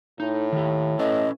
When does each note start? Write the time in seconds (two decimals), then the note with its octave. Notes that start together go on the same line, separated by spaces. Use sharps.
0.20 A2 D#4
0.52 D#3 G4
0.99 C#4 A4 B4 D#5